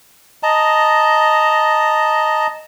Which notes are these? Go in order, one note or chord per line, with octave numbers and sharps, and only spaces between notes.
D#5 A5 A#5